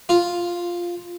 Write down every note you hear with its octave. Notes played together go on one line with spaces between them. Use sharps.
F4